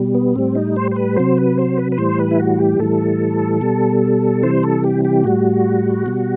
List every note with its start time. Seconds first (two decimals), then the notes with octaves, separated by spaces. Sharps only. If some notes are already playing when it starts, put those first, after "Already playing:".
Already playing: B2 G3
0.15 B3
0.35 A2 G3 C4
0.55 D#4
0.76 C5
0.91 C5
0.96 B4
1.16 C3 F#3 C5
1.38 B4
1.58 C5
1.78 B4
1.92 B4
1.98 A2 E3 G3 C5
2.19 B4
2.31 E4
2.40 F#4
2.59 G4
2.79 A2 E3 G3 A4
3.61 B2 G3
4.43 C3 E3 G3 C5
4.63 A4
4.84 G4
5.05 G4
5.24 A2 G3 F#4
6.06 B2 G3